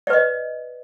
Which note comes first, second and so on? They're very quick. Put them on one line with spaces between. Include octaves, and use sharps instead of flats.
D5 B4 D#5